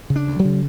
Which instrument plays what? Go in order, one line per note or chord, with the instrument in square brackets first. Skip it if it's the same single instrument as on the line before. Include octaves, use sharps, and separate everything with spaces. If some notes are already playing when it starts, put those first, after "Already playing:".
[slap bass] C#3
D4
D2
F#3
C#3